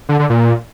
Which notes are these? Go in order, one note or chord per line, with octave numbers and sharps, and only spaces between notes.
D3
D3
A#2